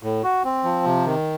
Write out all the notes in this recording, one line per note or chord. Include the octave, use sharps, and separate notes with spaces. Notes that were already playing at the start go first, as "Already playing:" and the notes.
A2
F#4
C4
F3
C3
D#3